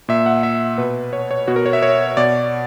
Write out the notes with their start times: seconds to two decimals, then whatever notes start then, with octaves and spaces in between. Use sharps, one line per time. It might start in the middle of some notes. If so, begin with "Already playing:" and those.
0.09 A#2 E5
0.26 F#5
0.43 E5
0.78 B2 B4
1.13 C#5
1.31 C#5
1.48 B2 F#4
1.56 A#4
1.66 C#5
1.73 E5
1.82 C#5
2.17 B2 D5